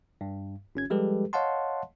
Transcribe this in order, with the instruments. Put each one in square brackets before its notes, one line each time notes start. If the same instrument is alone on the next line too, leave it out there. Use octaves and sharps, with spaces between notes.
[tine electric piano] G2
G1 C#4 G#6
F3 G3 G#3 G4 A4 B4
C#5 D#5 F5 F#5 A5 C6